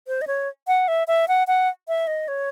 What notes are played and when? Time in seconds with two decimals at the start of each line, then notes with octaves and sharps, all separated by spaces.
0.08 C5
0.22 D#5
0.27 C#5
0.68 F#5
0.88 E5
1.08 E5
1.28 F#5
1.47 F#5
1.88 E5
2.07 D#5
2.28 C#5